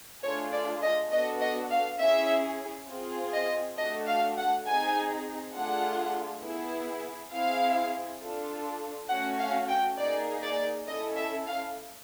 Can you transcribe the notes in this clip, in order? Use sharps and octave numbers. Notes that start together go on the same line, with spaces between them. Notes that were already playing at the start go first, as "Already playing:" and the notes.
A3 D4 F4 G#4 C#5
D5
D#5
B3 D4 F#4 A4 D#5
D#5
F5
C#4 E4 G#4 E5
C4 F4 G#4
D#5
A3 D4 F#4 A4 D#5
F5
F#5
C4 D#4 G#4 G#5
A3 D4 F4 G#4 F#5
B3 E4 G#4
C4 E4 G#4 F5
D4 F4 A4
A3 C#4 F#4 F#5
F5
G5
A#3 D#4 G#4 D5
D5
C#4 E4 A4 D#5
E5
F5